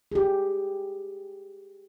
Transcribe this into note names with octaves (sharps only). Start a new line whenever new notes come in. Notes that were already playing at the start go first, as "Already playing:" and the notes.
G4 G#4